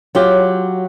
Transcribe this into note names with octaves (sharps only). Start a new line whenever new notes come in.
F#3 F4 G4